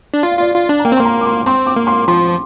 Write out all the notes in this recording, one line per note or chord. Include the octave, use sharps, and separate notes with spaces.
D4
F4 D5
F5
F4 D5
F4
D4
A#5
A#3 G5
C4
A#3 C6
A#5
D6
C6
C4 C6
D6
A#3
C6
F3 C6